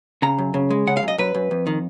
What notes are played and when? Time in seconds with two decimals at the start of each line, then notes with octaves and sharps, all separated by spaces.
0.22 C#3 A#5
0.38 F#2
0.54 C#3
0.71 G#3
0.87 C#3 F#5
0.97 F5
1.03 F#2 D#5
1.18 F#2 B4
1.35 F#2
1.51 F2
1.67 D#3